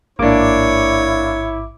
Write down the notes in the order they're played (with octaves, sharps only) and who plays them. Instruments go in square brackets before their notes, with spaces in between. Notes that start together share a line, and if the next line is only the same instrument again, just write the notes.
[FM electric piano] A1 G#2 D6 [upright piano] A#3 D4 [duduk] E4 [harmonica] C#5